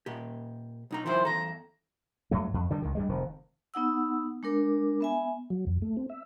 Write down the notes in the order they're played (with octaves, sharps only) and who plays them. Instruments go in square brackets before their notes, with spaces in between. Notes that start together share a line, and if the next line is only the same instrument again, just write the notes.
[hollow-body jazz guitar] A#2 G4
B1 D#4 A#5
[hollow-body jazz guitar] D#3 F3 E4 [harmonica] C5
[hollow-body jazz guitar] E2 A4 [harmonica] A#5
[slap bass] G2 F#3 A3
F2
D3 D#3 G3
C#2 D#3
G2 G3 G#3
F1 D#3 F3
[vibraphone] B3 D#4 F#5 E6
G#3 D4 A#4 D6
B3 E5 G#5
[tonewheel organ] F#3
F2
A3
C4
E5